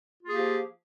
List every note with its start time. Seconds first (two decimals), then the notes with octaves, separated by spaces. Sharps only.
0.23 F4
0.26 A#3
0.30 G#4
0.33 G4
0.37 F3